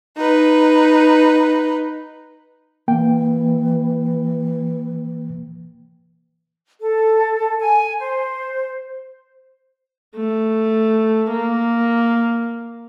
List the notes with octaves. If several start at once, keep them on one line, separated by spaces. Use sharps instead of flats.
D#4 B4
E3 A#3 G5
A4
G#5
C5
A3
A#3